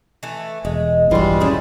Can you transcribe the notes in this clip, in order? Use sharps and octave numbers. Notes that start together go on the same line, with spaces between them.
E3 A3
E1 G#3
A#1 G2 E3 G3 G#3 F4 F#4
D#1 F3 A3 C#4 E4 G#4